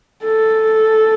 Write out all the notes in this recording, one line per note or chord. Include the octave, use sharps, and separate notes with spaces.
A4